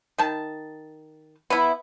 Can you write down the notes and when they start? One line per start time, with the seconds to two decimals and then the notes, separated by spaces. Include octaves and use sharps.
0.18 D#3 A5
1.50 B3 E4